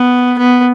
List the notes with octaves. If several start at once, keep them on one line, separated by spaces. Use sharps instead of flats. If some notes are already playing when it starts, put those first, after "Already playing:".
Already playing: B3
B3